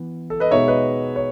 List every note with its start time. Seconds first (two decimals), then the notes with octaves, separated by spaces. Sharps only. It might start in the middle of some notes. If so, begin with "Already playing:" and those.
Already playing: E3 B3
0.30 A4
0.40 B4 D#5
0.51 B2 G#3 B3 D#4 C#5 E5
0.68 B4 D#5
1.16 C#5